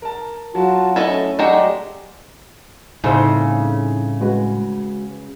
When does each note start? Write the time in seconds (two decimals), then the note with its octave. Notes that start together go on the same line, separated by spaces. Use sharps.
0.02 A#4 A5
0.55 F#3 F4 F#4 A5
0.96 A3 C#4 E4 A4 D#5
1.39 F#3 G#3 A3 F#4 G4 D5 G5 A#5
3.04 C2 A2 C#3 A3 D#4 C5 E6
4.21 G#3 F#4 B4